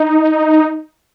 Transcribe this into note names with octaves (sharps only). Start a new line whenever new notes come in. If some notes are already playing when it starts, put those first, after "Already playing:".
Already playing: D#4